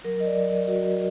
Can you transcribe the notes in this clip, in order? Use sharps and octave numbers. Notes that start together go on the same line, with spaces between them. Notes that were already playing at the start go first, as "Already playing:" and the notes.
F#3 A#4
D#5
D5
F#3
F#3 F#4